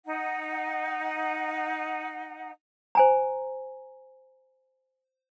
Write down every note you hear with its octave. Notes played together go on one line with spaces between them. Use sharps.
D#4 F#5
C5 G#5 A#5